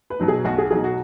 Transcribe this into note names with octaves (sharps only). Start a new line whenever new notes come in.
B4
B2 F#3 D#4
G#4
B1 F#4
G#4
B2 F#3 D#4 G#4
F#4